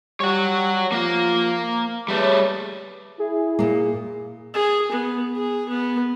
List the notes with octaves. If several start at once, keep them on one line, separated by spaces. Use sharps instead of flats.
G3 C#5 F#5
F3 A#3 F4 F5
G3 A3 G#4 B4 C#5
E4 G#4
A#2 A#3
G#4
B3
G#4
B3